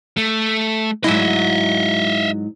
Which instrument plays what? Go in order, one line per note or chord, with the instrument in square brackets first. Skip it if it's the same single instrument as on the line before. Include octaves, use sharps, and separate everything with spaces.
[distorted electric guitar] A3
[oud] G#2 F#3 E4 [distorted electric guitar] D#5 E5